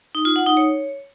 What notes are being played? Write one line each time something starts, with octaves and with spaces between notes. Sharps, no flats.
D#4
F4
F#5
D#4
C#5